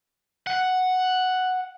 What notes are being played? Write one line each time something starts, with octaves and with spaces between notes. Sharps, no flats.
F#5